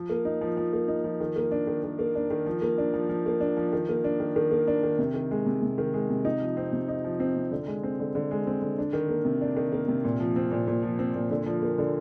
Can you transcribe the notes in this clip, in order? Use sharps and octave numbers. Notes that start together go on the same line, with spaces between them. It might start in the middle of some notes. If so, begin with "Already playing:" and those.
Already playing: F3
A#3
D#4
F3
F3
A#3
D#4
F3
D#3
A#3
D4
D#3
D#3
A#3
D4
D#3
F3
A#3
D4
F3
F3
A#3
D4
F3
D#3
A#3
D4
D#3
D#3
A#3
D4
D#3
C3
D#3
G#3
C3
C3
D#3
G#3
C3
D#4
F3
C4
C3
D#4
F3
C4
C3
D3
G#3
C4
D3
D3
G#3
C4
D3
D4
D#3
A#3
C3
D4
D#3
A#3
C3
A#2
F3
C4
A#2
A#2
F3
C4
A#2
D3
F3
A#3
D3